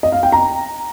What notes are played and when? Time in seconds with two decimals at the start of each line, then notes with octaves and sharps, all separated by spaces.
0.03 D#5
0.12 F5
0.23 G5
0.32 A#5